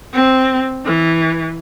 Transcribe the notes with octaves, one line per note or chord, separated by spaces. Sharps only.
C4
E3